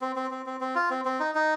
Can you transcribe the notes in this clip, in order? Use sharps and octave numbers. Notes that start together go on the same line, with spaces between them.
C4
C4
C4
C4
C4
F4
C4
C4
D#4
D#4